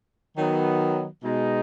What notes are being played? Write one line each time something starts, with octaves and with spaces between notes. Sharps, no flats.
D#3 F#3 B3
B2 G#3 D#4